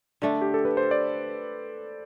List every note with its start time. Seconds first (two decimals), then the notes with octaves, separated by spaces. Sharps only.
0.22 D3 A3 D4
0.42 G4
0.54 A4
0.65 B4
0.77 C5
0.91 D5